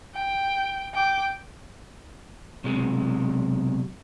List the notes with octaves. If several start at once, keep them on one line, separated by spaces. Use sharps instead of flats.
G5
G5 D6
B1 C3 G#3